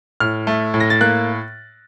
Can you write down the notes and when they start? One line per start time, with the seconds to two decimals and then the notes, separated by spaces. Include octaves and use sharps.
0.20 A2 F6
0.47 A3
0.74 A2
0.80 A#6
0.90 A6
1.01 A#3 F#6